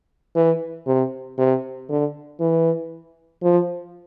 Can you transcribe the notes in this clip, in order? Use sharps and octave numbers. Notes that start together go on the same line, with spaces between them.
E3
C3
C3
D3
E3
F3